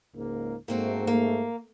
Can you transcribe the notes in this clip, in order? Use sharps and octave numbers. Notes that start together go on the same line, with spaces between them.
C#2 G#2 A#3
G#2 A3 A#3 C4 F#4
A#3